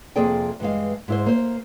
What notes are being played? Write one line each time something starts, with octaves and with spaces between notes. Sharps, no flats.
F2 C3 A#3 G#4 D5 G5
G2 E3 G#3 F5
G#2 E4 C5
A#3 C5